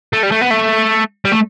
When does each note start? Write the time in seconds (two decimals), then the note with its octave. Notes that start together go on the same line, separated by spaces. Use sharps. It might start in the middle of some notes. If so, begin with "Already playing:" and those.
0.13 A3
0.23 G3
0.31 A3
0.41 B3
0.50 A3
1.25 G3
1.32 A3